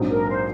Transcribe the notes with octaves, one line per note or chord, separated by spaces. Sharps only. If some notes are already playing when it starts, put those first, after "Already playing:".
Already playing: A#1 G#2 F#3 C4 D#4
A#4
C5